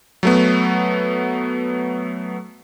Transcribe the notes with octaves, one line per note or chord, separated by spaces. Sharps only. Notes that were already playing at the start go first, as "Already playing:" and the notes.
F#3 A3 B3